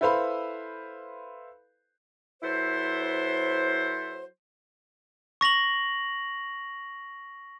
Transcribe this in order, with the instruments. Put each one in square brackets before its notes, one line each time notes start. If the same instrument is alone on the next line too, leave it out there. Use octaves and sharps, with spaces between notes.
[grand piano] E4 A4 B4 C5 F5 B5
[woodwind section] F#3 E4 A4 B4 C5
[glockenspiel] C#6 A#6 F7 F#7